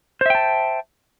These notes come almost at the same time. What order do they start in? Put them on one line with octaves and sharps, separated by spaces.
C5 E5 G5 A5